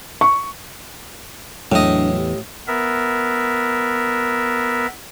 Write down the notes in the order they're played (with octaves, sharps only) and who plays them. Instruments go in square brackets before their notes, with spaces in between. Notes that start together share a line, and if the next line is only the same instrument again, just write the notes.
[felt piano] C#6
[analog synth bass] E2 [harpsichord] A2 D#5 [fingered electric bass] F#3 [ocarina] D4
[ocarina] G4
[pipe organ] B3 A#4 E5